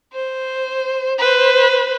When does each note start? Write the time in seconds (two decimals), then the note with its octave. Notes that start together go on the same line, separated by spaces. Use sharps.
0.14 C5
1.19 B4 C5